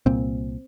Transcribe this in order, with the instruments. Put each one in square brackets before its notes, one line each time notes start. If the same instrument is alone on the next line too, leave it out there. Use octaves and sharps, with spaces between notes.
[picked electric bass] C2 A#2 C4